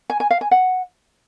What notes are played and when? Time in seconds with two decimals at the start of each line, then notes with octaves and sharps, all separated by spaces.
0.10 G#5
0.20 G#5
0.31 F5
0.41 G#5
0.51 F#5